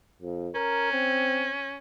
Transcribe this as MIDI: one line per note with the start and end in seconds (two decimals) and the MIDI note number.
0.22 0.50 41
0.55 1.76 61
0.55 0.91 70
0.92 1.53 60